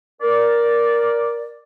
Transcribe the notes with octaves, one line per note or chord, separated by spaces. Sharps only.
A#4 D5